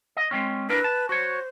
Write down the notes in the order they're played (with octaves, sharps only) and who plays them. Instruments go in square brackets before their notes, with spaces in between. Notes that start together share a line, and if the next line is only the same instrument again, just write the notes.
[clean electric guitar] D#5
G#3 C4 C#4
[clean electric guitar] D4 E4 A#4 [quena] B4
[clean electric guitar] A5
[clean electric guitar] F#4 C#5 [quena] C5